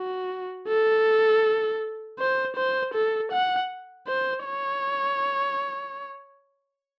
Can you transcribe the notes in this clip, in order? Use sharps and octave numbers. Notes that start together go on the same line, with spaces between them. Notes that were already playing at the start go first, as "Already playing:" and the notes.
Already playing: F#4
A4
C5
C5
A4
F#5
C5
C#5